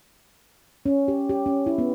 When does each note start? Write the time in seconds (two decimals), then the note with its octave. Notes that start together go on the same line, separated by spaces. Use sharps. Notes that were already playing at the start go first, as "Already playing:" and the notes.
0.86 C#4
1.08 G4
1.29 G4
1.46 C#4
1.66 E4
1.78 B3